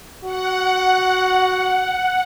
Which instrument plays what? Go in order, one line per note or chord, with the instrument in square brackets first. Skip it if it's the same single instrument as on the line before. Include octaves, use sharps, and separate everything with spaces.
[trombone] F#4 [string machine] F#5